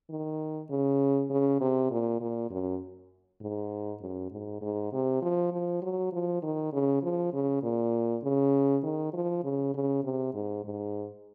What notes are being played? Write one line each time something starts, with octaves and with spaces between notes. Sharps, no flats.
D#3
C#3
C#3
C3
A#2
A#2
F#2
G#2
F#2
G#2
G#2
C3
F3
F3
F#3
F3
D#3
C#3
F3
C#3
A#2
C#3
D#3
F3
C#3
C#3
C3
G#2
G#2